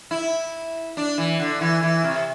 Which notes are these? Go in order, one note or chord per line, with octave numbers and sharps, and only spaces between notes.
E4
D4
E3
D3
E3
E3
C3